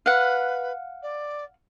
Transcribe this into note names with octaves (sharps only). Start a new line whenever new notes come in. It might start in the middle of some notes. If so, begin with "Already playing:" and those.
B4 F5 F#5
D5